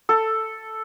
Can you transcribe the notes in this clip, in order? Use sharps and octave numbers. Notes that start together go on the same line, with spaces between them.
A4